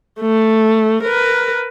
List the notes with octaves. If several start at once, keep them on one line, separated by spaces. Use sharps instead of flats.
A3
A#4 B4